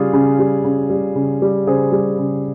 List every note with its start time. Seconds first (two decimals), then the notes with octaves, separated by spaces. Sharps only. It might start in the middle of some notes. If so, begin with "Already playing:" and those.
Already playing: C#3 G3 F4 G#4
0.13 C#3
0.39 G3
0.64 C#3
0.90 G3
1.15 C#3
1.42 G3
1.67 C#3 G#4 C5
1.92 G3
2.18 C#3